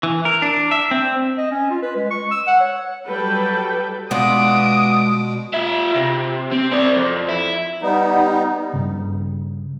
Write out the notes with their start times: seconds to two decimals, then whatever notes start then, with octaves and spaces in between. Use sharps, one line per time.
0.03 E3
0.25 A#4
0.42 D4
0.71 E5
0.91 C4
1.38 D#5
1.51 C#4
1.71 F4
1.82 B4
1.96 G#3
2.11 C#6
2.31 E6
2.47 F#5
2.60 C#5
3.08 F#3 G3 A4 B4 G5
4.11 B2 G#3 B3 D4 F4 D#6 D7
5.54 F4 E5
5.96 C3
6.51 C4
6.72 C5 D5
6.96 F2
7.28 E4
7.82 G3 B3 D#4
8.73 G2 C#3